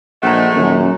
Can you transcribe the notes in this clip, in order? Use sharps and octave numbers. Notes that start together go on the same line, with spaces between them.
A#1 G#3 A3 F#5 A#5
D#1 F#2